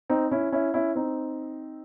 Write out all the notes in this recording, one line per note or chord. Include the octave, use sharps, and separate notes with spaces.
C4 D#4
C#4 E4
C#4 E4
C#4 E4
C4 D#4